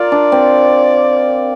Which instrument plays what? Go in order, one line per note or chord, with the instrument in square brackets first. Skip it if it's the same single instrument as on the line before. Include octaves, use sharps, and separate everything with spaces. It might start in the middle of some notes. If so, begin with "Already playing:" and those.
Already playing: [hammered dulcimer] F4 A#4 [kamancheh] D5
[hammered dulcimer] D4
C4